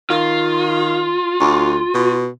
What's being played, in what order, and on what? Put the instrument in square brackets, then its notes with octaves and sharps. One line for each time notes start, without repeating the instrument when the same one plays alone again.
[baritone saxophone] D#3 [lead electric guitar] F4
[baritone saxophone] D2
B2